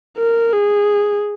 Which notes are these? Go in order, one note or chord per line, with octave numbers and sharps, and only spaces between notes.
A#4
G#4